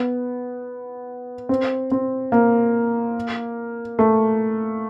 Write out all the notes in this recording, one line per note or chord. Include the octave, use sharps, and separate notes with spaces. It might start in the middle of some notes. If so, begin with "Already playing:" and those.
Already playing: B3
C4
C4
A#3
A3